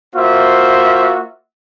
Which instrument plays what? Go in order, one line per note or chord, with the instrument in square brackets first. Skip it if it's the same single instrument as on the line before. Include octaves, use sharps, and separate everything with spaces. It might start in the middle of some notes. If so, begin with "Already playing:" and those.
[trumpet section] A#3 F4 F#4 C5 E5